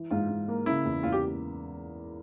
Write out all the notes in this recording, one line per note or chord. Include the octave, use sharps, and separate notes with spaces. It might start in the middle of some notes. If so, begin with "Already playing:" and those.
Already playing: E3
G#2 F4
G#2
A#3
C#3 E4
E2
E2 F4
G4